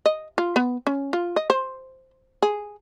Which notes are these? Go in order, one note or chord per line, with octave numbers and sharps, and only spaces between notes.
D#5
F4
B3
C#4
F4
D#5
C5
G#4